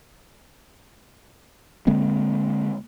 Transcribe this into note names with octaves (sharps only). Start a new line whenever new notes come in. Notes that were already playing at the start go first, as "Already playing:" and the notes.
D3 G#3 A#3 C4